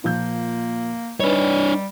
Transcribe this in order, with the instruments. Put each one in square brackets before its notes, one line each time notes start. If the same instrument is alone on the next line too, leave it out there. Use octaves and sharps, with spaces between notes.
[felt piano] A#2 F3 G6 [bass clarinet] A#3
[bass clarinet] G3 [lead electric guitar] D4 C#5 [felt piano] D#4 B4